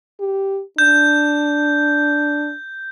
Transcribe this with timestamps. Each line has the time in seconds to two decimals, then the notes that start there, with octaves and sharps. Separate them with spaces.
0.21 G4
0.78 D4 G6